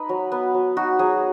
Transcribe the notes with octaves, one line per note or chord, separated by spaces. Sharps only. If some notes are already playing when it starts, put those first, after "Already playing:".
Already playing: D#4 B4
F#3
B3
F#3
D#4 F#4
F#3 G#4